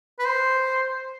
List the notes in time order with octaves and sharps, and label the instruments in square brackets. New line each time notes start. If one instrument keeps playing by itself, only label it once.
[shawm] B4
C5